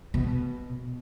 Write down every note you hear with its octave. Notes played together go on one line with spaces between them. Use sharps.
B2